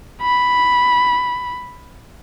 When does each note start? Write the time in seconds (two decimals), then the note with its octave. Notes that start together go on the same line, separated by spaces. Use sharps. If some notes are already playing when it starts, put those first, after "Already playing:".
0.22 B5